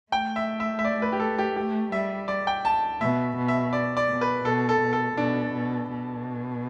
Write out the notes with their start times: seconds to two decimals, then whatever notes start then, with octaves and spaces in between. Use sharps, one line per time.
0.12 A3 G5
0.36 E5
0.60 E5
0.79 E5
0.85 D5
1.02 B4
1.12 G4
1.20 A4
1.38 G4
1.56 A3 G4
1.92 G3 E5
2.28 D5
2.47 G5
2.65 A5
3.01 B2 E5
3.37 B2
3.48 E5
3.73 D5
3.97 D5
4.09 B2
4.21 B4
4.45 B2 A4
4.69 A4
4.81 B2
4.93 A4
5.17 B2 D4
5.53 B2
5.90 B2